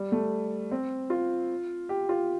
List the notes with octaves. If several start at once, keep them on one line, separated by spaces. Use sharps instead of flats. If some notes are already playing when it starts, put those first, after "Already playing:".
Already playing: G3
A3
C4
F4
G4
F4